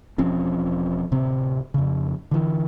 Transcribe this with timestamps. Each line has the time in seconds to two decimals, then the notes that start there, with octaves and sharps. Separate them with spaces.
0.18 E1 F3 C4 C#4
1.11 D1 C3 C4
1.74 F2 C#3
2.31 D3 E3